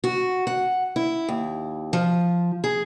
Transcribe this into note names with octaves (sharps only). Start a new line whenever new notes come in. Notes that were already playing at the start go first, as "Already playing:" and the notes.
F#4
F#5
E4
D#2
F3
G#4